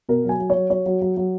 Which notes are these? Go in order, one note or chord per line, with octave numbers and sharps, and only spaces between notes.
B2 A#4
F#3 G#5
F#3
C#5
F#3
F#3 C#5
F#3
F#3
F#3